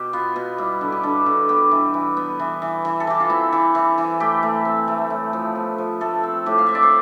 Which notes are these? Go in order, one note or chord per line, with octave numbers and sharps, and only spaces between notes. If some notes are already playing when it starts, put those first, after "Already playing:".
Already playing: B2 G4
B3 F4
B2
G3 E4
D3
G4
D3 A4
D3
B3 G4
E3
E3
B3
E3
E3
E3
A4
E3 G4
F4
C4 E4
E3
E3
E3
A3 G4
A3
C4
A3
A2
F3
B3
F3
A3 A4
C4
A2 G4
F5
C4 E5
D5
C5